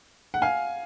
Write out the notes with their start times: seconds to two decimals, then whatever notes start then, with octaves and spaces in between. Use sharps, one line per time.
0.34 F#5
0.42 F5 G#5